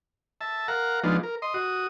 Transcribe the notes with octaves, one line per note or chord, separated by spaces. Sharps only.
E5 A5
A#4 F5 F#5 A#5
F3 G#3 B3 D4 D#4 F4
A#4
D#5 C6
F#4 D#6